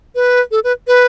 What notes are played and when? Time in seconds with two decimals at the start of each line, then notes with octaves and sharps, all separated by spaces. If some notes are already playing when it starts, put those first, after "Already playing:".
0.15 B4
0.51 A4
0.64 B4
0.87 B4